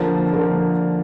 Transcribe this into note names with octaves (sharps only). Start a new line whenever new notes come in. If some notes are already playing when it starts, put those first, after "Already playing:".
Already playing: D3 F3 A#3
D3 F3 A#3